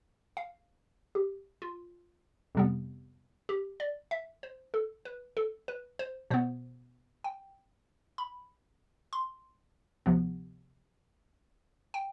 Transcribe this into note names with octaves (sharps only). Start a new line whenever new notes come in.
F5
G4
F4
F2 C3 G3 B3
G4
D5
E5
C5
A4
B4
A4
B4
C5
B2 B3 C5
G5
B5
C6
D2 C3 F3 B3
G5